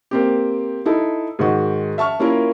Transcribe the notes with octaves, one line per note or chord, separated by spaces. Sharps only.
A#3 C4 G4
D#4 E4 A4
G#2 D#3 F#4
E5 A5 C#6 F6
A#3 C#4 E4 F4 A#4